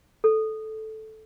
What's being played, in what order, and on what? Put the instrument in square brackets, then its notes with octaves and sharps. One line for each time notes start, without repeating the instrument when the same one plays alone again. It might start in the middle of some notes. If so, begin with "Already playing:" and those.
[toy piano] A4